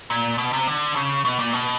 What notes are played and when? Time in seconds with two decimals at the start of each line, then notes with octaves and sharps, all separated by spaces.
0.10 A#2
0.38 B2
0.53 C3
0.67 D3
0.96 C#3
1.25 B2
1.39 A#2
1.53 B2